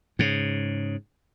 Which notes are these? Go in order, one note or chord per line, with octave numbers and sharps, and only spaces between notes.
G#2 C#3